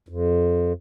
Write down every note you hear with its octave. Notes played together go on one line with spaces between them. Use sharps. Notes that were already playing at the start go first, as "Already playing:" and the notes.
F2